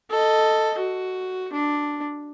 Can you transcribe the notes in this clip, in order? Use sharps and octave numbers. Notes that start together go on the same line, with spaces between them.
A4 D#5
F#4
D4